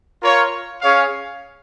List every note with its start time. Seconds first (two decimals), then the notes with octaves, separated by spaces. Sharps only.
0.21 F4 A#4 C#5 F5
0.82 C#4 G#4 C#5 F5